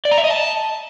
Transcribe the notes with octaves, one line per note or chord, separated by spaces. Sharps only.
D5
A#5
E5
D#5
A5